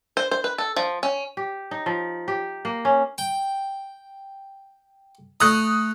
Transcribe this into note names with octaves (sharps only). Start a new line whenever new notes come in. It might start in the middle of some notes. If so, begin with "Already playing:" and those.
C5
C5
B4
A4
F3
C#4
G4
D#4
F3
G4
A#3
C#4
G5
A3 A#5 D#6 F#6